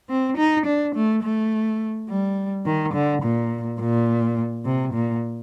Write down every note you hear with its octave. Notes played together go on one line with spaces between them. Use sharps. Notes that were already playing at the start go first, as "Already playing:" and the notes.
C4
D#4
D4
A3
A3
G3
D#3
D3
A#2
A#2
C3
A#2